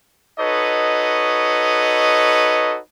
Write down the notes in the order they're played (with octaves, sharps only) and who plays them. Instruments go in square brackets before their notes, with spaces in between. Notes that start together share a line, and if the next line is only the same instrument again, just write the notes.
[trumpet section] D#4 F#4 A4 B4 C#5 D#5